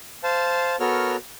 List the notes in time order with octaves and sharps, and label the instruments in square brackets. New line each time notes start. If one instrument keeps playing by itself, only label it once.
[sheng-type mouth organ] C5 F5 A5
B3 F#4 A4 A#4 C#5 F6